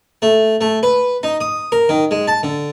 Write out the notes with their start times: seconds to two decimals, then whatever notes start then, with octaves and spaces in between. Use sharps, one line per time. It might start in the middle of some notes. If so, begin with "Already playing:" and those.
0.22 A3
0.61 A3
0.83 B4
1.23 D#4
1.41 D#6
1.72 A#4
1.89 D#3
2.11 G#3
2.28 A5
2.43 D3